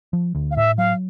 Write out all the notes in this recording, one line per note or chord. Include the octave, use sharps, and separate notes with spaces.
F3
D2
F5
A2 E5
F#3 F5